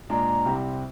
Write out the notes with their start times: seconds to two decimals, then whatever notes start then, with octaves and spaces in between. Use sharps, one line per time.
0.10 A#2 G#3 D4 A#5
0.45 C2 C3 G3 C4 G4